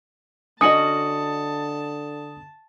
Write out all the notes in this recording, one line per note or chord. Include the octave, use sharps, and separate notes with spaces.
D3 C#4 F#4 D#5 A5 D#6 C#7